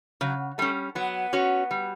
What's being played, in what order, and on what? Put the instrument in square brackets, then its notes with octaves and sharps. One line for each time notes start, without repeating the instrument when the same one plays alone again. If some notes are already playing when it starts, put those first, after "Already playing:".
[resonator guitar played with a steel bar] C#3 [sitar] F#3
[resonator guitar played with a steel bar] G3 C#4 [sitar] A3
[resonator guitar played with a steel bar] F#3 [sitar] B3
[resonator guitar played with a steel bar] C#4 F#4 C#5
G3